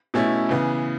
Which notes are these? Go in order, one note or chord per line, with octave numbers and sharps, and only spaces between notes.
B2 A3 C#4 E4
C#3 E3 B3